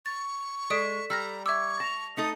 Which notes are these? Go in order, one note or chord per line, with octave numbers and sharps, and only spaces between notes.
C#6 A6
G#3 A4 D5 D#6 B6 D7 E7
G3 A#5 E6 F6 A#6
E5 C#6 D6 E6 G#6
A5 A#6 F7
A3 D#4 A4 D#6